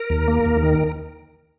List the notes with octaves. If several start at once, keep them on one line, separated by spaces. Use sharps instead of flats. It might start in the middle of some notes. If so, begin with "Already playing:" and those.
Already playing: A#4
D#2
A#3
D#2
D#3